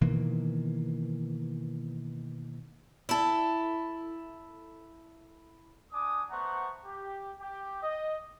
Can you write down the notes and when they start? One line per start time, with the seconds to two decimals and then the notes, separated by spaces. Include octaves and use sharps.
0.01 B2 D#3 E3 A#3
3.09 E4 A4
5.92 D4 G#5 D6 D#6
6.31 A3 B3 C5 F#5 A#5 C#6
6.86 G4
7.40 G4
7.83 D#5